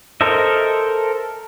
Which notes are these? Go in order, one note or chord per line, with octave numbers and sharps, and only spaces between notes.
A4 A#4 C5 D#5 E5